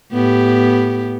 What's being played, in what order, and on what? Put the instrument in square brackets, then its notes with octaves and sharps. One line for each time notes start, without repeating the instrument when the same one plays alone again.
[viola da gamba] A2 B3 G4